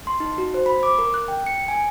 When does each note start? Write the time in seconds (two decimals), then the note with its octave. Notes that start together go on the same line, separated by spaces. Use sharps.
0.07 C6
0.20 D#4
0.38 F#4
0.54 C5
0.66 B5
0.83 D6
0.98 A#4
1.14 F#6
1.28 G5
1.46 C#7
1.68 G#5